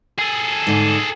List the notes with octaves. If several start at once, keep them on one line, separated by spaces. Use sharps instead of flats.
G#4 A4
G#2 D3